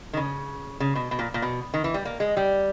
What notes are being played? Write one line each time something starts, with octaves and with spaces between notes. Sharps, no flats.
D#3
C#3
C#3
B2
B2
A#2
A#2
B2
D#3
E3
G3
A#3
G#3
G3